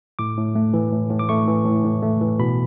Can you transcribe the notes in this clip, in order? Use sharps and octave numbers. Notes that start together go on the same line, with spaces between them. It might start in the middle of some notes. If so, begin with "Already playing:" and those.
A2 D6
A2
A3
E3
A2
A2
D6
A3 C#6
E3
A2
A2
A3
E3
B2 B5